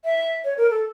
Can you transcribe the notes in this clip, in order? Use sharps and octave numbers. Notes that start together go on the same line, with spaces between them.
E5
C#5
A#4
A4